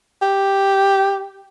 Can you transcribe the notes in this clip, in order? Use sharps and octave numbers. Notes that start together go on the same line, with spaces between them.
G4